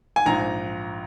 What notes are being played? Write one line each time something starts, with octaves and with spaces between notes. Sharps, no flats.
G#5
A#1 G#2 F3 A#5